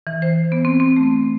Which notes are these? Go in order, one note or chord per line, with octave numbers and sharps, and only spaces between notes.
E3
C5
B3
C4
C4
A3